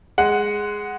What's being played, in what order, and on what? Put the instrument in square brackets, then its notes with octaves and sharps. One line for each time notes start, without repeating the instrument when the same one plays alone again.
[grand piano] G#3 F#5